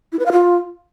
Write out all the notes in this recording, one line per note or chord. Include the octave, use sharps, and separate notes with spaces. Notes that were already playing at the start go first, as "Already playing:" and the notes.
E4
B4
F5
F4